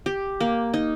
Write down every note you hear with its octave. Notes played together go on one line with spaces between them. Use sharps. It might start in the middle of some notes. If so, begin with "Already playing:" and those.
G4
A#3
D#4